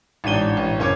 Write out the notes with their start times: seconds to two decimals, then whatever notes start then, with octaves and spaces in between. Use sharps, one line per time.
0.24 A1 G#2 D4 D#7 G7
0.57 A1
0.79 F#1 C#4 C#5 D6